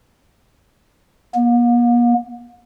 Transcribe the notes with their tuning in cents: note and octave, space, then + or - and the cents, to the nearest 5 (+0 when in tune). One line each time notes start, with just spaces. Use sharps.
A#3 +45